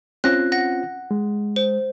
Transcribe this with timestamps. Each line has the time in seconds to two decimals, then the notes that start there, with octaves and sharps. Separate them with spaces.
0.24 C4 C#4 F4 F#6 A#6
0.52 F#5 A#6
1.11 G#3
1.56 C5